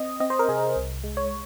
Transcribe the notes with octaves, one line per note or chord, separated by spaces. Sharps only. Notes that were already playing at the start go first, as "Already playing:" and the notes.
Already playing: C4 D#5
C4 D#5
C5
A#4
C3 G#4
C2
G#3
C#5